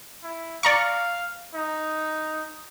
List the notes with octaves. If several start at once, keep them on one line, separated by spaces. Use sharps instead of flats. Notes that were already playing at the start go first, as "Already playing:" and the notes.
E4
D5 F5 A#5 C#6
D#4